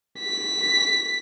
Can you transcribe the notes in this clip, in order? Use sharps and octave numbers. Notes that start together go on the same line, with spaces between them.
B6